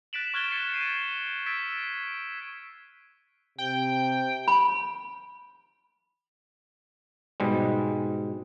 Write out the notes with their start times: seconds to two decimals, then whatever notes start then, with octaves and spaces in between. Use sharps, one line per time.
0.13 F#6 A6 B6 D7 E7 F#7
0.34 C#6 F6 F#6 G#6 A6 G7
0.52 A6 B6 C#7
0.72 G6 C7 D#7
1.46 E6 G#6 A6 B6 D7 E7
3.58 C3 G5
4.48 B5
7.40 G#2 B2 G3 G#3